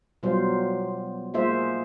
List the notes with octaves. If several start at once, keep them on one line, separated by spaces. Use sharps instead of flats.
B2 F#3 G3 F4 C5
G#3 A#3 F4 C5 E5